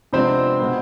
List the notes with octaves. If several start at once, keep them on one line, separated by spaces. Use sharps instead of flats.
C3 F3 G#3 B3 C4 D4 C5
B2 G#3 B3